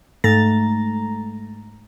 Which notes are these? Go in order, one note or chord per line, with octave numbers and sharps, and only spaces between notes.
G#2 A3 A#5 A6